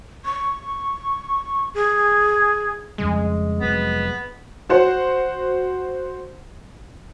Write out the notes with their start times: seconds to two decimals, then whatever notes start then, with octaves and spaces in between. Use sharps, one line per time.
0.25 C#6
1.74 G#4
2.98 F2 C#3 G3 G#3
3.60 F1 F#3 B3 C4
4.69 F#4 C5 F#5